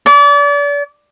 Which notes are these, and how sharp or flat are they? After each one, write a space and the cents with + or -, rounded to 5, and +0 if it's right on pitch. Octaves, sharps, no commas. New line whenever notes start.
D5 -35